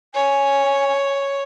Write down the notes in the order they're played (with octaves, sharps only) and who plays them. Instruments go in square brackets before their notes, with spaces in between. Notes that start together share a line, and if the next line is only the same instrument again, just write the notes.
[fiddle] C#5 [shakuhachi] G#5